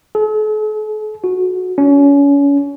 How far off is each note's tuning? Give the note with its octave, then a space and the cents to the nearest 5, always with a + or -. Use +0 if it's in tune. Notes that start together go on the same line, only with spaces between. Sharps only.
A4 -45
F#4 -15
C#4 +30